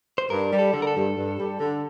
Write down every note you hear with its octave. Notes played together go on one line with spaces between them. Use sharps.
C5
G2 A#4
G3
A4
D3
A#4
A4
G2
G2
G3
D3